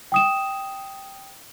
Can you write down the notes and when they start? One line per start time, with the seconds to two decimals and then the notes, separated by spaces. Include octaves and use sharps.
0.12 G5 D#6 E7